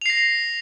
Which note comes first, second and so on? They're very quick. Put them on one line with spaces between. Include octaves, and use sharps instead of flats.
F7 C7 A#6